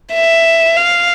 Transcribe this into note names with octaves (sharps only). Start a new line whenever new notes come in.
E5
F5